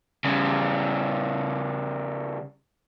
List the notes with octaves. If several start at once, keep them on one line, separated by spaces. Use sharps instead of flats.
C#3 G3